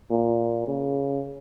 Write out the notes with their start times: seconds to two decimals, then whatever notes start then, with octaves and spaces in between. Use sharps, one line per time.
0.10 A#2
0.67 C#3